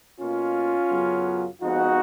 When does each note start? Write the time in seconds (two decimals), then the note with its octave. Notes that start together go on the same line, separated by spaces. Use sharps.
0.19 B2 A#3 C#4 F4
0.90 F#2 C#3 F#3 B3
1.60 F2 F3 G#3 B3 D#4 F#4